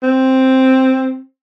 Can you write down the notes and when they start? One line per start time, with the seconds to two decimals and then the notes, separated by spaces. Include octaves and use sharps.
0.03 C4